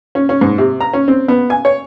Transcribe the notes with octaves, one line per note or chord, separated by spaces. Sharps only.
C#4
C#4
G#2
C3
A#5
C#4
C4
B3
G#5
C#5